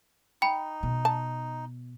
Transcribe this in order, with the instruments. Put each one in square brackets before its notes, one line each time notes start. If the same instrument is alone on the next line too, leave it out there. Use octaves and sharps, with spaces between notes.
[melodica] D#4 [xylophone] G5 B5
[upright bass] B2
[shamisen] A5